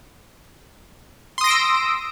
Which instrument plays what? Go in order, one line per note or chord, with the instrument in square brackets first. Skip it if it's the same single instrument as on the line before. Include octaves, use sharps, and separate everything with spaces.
[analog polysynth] C6
D#6
A#6
D7
E6